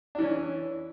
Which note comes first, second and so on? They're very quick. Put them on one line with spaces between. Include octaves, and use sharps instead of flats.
D4 E3 C#4